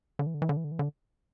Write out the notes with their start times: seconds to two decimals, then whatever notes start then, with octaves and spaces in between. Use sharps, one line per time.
0.19 D3
0.27 E3
0.34 D3
0.42 E3
0.49 D3
0.57 E3
0.64 D3
0.72 E3
0.79 D3